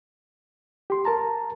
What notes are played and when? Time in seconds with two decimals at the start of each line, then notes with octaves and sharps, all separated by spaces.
0.90 G4 C6
1.05 A#4 A5 A#5